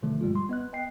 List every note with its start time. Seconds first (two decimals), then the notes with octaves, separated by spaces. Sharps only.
0.02 D#2 B2 D3 D#3 F3 A3
0.21 G2 G3 G#3 F4
0.36 C6
0.49 B3 D#5 F#6
0.73 D#5 G5 C7